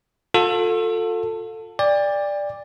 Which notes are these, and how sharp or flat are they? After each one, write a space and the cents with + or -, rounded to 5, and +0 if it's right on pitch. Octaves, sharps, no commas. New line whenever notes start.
F4 +40 A4 +15
D5 +0 G5 +40